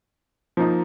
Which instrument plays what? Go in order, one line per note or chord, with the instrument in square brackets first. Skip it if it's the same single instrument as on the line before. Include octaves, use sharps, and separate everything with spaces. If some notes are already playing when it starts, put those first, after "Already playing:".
[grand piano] F3 A#3 D#4